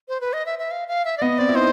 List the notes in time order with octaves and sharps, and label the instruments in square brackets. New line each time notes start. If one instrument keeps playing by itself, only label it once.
[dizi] C5
B4
D#5
E5
E5
F5
F5
E5
D5
[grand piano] B3 [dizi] D#5
[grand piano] C4 [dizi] D5
[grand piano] E4
[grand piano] D#4 [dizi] C5